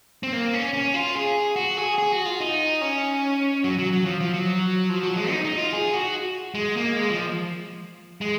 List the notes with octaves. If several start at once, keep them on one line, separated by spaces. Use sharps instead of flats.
C4
A#3
C#4
C#4
F4
G#4
F#4
G#4
G#4
F#4
F4
D#4
C#4
F#3
F#3
F#3
F3
F3
F#3
F3
F#3
G#3
D#4
D#4
F4
G#4
F#4
G#3
A#3
G#3
F3
G#3